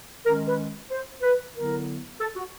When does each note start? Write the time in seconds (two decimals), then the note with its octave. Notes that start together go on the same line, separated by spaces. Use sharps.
0.25 D#3 A#4
0.28 G#3 C#4
0.46 B4
0.90 C5
1.22 B4
1.55 D3 F#3 B3 E4 A#4
2.20 A4
2.36 F#4